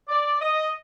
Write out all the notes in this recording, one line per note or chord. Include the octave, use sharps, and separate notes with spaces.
D5
D#5